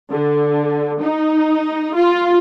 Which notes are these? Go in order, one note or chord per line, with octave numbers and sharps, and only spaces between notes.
D3
D#4
F4